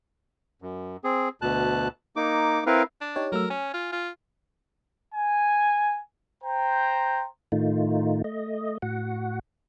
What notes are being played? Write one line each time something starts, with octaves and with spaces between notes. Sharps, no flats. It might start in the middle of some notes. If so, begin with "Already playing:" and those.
F#2
C4 G#4
D2 B2 A5 F#6
A#3 D#4 D6
C4 E4 A#4 B4 F5
D4
D#4 G4 C#5
F#3 A3 A#4 E6
C#4 G#5
F4
F4
G#5
C5 G5 A#5
A2 D#3 A3 D#4 F4
A3 D#5
A2 F#4 F#5